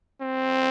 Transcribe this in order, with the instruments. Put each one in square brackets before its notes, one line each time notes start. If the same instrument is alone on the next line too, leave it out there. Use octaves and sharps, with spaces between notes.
[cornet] C4